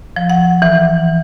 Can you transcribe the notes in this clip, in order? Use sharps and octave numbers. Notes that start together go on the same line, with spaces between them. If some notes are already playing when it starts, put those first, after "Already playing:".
F3
F#5
E3